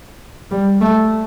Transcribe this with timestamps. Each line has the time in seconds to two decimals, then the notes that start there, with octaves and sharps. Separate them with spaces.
0.51 G3
0.81 A3